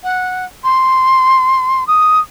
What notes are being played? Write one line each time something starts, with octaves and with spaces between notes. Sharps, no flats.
F#5
C6
D#6